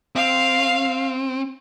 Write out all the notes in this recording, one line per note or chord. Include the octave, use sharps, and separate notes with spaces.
C4 F5